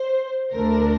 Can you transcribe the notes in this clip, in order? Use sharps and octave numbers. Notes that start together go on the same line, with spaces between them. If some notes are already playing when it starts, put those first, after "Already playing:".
Already playing: C5
D2 D3 A3 D4 A#4